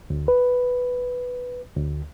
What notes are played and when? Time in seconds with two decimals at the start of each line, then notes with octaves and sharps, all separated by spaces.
0.10 D2
0.28 B4
1.76 D2